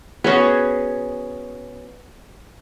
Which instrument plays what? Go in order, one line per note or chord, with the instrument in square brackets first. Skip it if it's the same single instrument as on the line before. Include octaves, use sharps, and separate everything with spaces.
[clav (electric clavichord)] B3 C#4 F#4 [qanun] G#4 B4